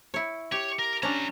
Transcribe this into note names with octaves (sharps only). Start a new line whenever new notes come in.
E4 C#5
G4 C#5
A#4
G3 C#4 D4 A#5